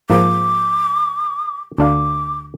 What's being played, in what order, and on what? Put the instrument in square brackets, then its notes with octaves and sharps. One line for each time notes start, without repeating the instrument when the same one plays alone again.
[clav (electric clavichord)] G#2 F3 A#3 [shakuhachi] D6
[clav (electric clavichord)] D2 D4 F5 [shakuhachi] D6